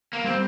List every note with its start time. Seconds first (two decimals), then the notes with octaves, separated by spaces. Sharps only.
0.13 A#3
0.24 G3 C4